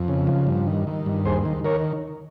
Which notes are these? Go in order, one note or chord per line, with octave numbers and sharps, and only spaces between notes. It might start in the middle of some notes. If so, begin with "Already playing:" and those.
Already playing: F2
C#3
F3
G2
D#3
D#3
G2
D#2 G#4 C5
D#3
D#3 A#4 C#5